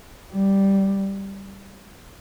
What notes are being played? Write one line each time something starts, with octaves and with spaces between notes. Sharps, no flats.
G3